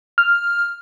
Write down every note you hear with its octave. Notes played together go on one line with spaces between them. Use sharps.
F6